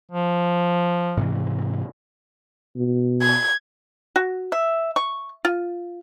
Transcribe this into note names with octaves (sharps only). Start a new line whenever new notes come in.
F3
G#2 C3 E3
B2
G#6
F#4
E5
C#6
F4